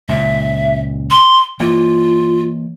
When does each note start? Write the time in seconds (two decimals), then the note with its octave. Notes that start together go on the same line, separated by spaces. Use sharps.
0.09 C#2 A#2 E5
1.10 C6
1.60 E3 A#3 F4